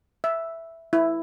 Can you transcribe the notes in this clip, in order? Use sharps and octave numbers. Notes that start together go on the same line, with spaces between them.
E5
E4